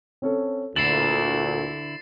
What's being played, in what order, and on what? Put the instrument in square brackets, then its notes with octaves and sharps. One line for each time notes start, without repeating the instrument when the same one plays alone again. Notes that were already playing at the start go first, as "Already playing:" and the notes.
[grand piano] C4 C#4 A4
[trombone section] D2 A#2 [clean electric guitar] D3 E4 [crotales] A6 C7 [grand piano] F#7